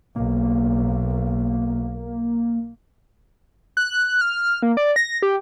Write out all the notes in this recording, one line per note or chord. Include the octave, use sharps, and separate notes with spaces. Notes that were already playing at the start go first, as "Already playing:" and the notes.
B1 A#3
F#6
F6
A#3
D5
A#6
G4